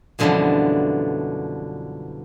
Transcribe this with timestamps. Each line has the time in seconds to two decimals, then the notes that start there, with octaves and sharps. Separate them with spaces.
0.19 F#2 B2 D3 E3 F3 G3